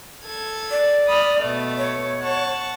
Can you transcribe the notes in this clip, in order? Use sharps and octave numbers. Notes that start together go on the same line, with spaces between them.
A4 G#6
D5
B5 D#6 F6
B2 A3
C#5
F#5 A5 C#6